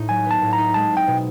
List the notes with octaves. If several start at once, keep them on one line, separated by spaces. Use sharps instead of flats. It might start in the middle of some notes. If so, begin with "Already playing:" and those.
Already playing: A2 D#4
F#3 G#5
B3
A5
A2
A#5
D#4
G#3 A5
C4
G5
B2